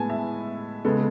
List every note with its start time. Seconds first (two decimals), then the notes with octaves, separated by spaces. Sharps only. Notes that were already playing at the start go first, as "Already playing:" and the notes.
Already playing: A2 G#3 B3 G#5 A5
0.09 E5
0.84 C#3 G#3 B3 A4